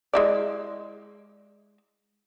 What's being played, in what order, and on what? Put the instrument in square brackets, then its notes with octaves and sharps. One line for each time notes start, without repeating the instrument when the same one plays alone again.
[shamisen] G#3 E4 D5